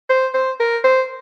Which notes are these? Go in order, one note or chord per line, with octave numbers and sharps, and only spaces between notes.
C5
C5
A#4
C5